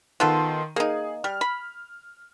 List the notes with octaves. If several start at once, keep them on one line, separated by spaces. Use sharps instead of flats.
D#3 B3 F4 A4 C6 D#7
A#3 D#4 G#4
G3 F6
B5